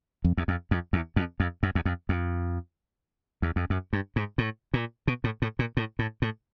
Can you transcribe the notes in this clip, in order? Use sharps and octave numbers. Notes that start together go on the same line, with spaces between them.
F2
E2
F2
F2
E2
F2
F2
F#2
E2
F2
F2
E2
F2
F#2
G2
G#2
A2
A#2
B2
A2
A2
A#2
A2
A2
A2